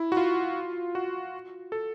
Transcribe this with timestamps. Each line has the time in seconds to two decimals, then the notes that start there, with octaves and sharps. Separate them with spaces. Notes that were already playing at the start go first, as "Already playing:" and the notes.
Already playing: E4
0.12 F#4
0.17 F4
0.95 F#4
1.72 A4